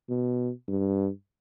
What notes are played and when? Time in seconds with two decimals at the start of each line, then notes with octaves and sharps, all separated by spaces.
0.09 B2
0.68 G2